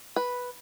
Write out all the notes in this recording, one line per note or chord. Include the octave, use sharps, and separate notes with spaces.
B4